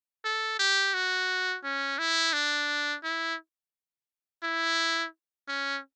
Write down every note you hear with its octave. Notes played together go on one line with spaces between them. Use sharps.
A4
G4
F#4
C#4
E4
D4
E4
E4
C#4